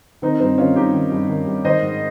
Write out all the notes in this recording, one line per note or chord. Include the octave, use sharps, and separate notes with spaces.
D#3 C4 D#4
G2 C4 D#4
D#3 C#4 F4
G2 D#4 G4
D#3
G2
D#3
G2
D#3 C5 D#5
G#2